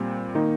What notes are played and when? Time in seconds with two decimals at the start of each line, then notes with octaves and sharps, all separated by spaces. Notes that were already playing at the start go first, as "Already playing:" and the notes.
Already playing: A#2 G3 C4
0.35 D#3 A#3 D#4